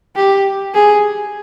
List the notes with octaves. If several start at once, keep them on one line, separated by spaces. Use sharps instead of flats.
G4
G#4